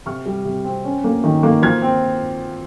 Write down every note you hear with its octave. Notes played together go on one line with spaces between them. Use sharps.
C3 C#6 F6
G3
C3
C4
C#4
A#3
D#3
A#3
F3 F6 G#6
C4